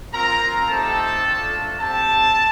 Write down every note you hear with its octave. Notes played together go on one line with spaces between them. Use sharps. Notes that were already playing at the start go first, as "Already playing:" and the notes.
C4 F4 A#4 A#5
A3 C4 D#4 G4 A4 A5
A3 D4 F4
C4 G4 A4 A5